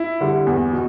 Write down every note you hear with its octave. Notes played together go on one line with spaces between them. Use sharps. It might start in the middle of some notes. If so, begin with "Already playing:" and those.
Already playing: E4
D3 G3
E2
B2